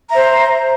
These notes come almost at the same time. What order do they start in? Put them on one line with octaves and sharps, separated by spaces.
A#5 E5 C5